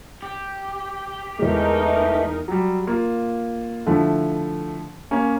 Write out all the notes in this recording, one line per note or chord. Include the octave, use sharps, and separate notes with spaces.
G4
E2 E3 G#3 A3 D#4 A#4
F#3 G3
A#3 F4
D3 F3 A3 E4
A#3 C#4